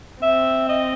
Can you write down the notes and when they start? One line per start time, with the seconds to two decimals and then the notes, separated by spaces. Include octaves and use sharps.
0.22 C4 E5
0.69 D#5